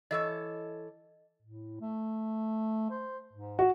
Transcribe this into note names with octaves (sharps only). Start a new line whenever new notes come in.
E3 A4 C#5 D#5
A2
A3
C5
G#2
F#4